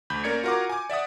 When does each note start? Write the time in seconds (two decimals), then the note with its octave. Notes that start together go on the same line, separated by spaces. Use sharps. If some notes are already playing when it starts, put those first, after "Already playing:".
0.10 D2 B5 G6
0.24 A#3 C#4 A#4 D5 G#6 C#7
0.43 F4 F#4 A#4 F#5 D6
0.69 G#5 D6
0.90 D5 E5 F#5 D#6